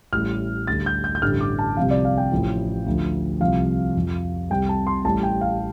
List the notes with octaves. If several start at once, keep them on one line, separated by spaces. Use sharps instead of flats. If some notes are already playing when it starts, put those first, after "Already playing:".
A1 A2 G3 F6
D2 D3 G3 A6
G6
G6
G6
A1 G2 D3 G3 F6
D6
A5
C2 C3 F3 F5
D5
F5
G5
A1 A2 F3
D2 D3 F3
C2 C3 F3 F5
F2 F3
C2 C3 G3 G5
A5
C6
A1 A2 G3 A5
G5
F5